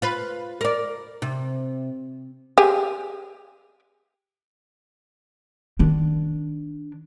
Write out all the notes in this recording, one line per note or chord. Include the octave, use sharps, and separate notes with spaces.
F4 B4
A#4 D5
C3
G4 G#4
D#3 D4